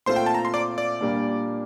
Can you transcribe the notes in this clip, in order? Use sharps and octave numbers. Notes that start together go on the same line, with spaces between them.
A#2 A3 C4 F4 C5 C6
G5
A5
A#5
C6
D5 D6
D5 D6
A#2 G3 A#3 D4